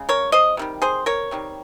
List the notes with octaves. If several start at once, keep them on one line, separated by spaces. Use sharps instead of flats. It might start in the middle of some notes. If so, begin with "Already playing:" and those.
Already playing: C#3 G#3
A#4 C#5
C5 D#5
C3 D#3 G3
G#4 C5
A#4 C#5
C3 D#3 G3